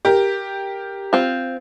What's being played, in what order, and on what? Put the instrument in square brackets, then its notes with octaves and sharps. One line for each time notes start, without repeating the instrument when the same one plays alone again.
[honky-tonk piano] G4 A#4
[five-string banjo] C4 F4